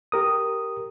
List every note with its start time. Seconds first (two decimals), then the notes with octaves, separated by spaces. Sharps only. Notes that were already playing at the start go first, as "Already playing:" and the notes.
0.12 G4 A#4 D#6